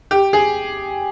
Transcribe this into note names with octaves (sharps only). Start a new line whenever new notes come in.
G4
G#4